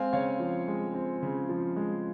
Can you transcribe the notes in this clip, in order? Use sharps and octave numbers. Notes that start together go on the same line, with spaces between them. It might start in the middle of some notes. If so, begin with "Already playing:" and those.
Already playing: G#3 C4 F5 G#5
C#3 C#5 F5
F3
G#3
C4
C#3
F3
G#3